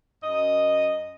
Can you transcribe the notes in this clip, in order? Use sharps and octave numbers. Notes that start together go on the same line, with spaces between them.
F#2 D#5